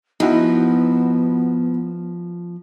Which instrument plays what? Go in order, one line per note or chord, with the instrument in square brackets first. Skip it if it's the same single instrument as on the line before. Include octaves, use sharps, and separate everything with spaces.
[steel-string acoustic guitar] F3 [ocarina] B3 [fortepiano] D#4 E4 F#4